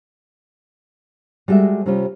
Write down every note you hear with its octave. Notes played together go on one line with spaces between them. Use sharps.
G3 G#3 F#4 A4 E5
C3 G3 C#4 F4 G4